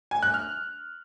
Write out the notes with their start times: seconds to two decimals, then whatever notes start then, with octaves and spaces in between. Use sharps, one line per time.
0.11 G#5
0.23 F#6
0.34 F6